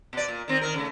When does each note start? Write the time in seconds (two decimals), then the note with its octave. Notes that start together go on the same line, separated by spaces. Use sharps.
0.13 B2 D5
0.28 A#2
0.48 D#3 C4
0.61 D#3 A#4
0.74 C#3 A3